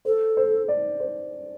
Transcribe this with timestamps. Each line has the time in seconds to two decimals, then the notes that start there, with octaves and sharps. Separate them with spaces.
0.05 A4 C5
0.37 C5
0.68 D5
1.00 C5